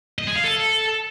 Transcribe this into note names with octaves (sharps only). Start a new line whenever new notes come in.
D#5
G#4
F5
A4